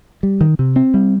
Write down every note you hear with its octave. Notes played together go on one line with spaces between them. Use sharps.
G3
D#3
C3
C4
G3